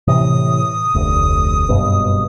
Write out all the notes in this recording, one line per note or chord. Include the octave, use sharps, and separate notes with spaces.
A2 C3 E3 D#6
F1 D2
F#1 G2 B2